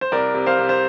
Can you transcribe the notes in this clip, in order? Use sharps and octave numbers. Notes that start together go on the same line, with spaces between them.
C5
C2 A#4 D5
C3
C5 F5
C3
C5